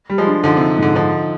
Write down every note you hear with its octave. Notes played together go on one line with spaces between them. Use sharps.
G3
F3 G#3
D4
D3 F3 D#4
C3 D#4
G#2 D3
D3 F3 D#4